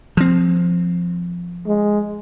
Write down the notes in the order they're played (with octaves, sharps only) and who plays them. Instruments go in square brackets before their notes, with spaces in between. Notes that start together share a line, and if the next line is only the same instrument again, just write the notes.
[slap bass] F3 C4
[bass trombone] G#3